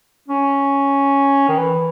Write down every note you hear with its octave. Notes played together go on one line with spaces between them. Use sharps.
C#4
D#3
E3